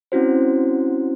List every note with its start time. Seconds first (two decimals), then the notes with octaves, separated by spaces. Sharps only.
0.12 C4 C#4 E4 F#4 C5